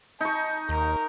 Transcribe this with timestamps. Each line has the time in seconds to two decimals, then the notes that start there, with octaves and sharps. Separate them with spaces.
0.21 D#4 A5 C#6
0.69 D#2 A#4